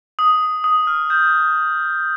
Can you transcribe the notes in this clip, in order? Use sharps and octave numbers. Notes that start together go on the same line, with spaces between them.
D#6
D#6
F6
G6